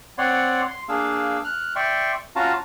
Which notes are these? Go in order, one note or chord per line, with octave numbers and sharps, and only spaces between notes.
C4 C#5 D5 F#5 C6
C6
A#3 D4 G#4 F5 E6
F6 F#6
D5 E5 G5 C6 C#6
C#4 F4 F#4 F5 A5 A#5